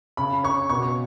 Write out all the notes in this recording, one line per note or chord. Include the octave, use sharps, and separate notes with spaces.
C#3 B5
C#4 C#6
B2 C#6